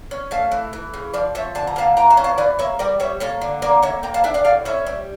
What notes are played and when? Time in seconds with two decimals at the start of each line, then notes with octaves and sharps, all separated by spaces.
0.11 C#4
0.31 A3 F5 A5
0.52 E3
0.73 E3
0.94 C#3
1.13 F3 D5 F5
1.35 F3 C#5 E5
1.55 D3 A5
1.67 A#5
1.76 A#3 F5 A5
1.97 E3 G5 A#5
2.10 F5 A5
2.17 C#4
2.24 F5 A5
2.38 E3 D5 F5
2.59 A#3 C#5 E5
2.79 G3 A#4 D5
3.00 G3 C#5 E5
3.20 A#3 A4 C#5
3.41 D3
3.62 A#3 A#4 D5
3.82 A#3 C#5 E5
4.03 A#3 G5 A#5
4.14 F5 A5
4.24 D4 E5 G5
4.34 D5 F5
4.45 A2 D5 F5
4.65 C#4 C#5 E5
4.86 G3